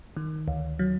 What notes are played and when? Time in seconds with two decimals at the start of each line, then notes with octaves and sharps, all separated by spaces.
0.17 D#3
0.48 D2
0.79 F#3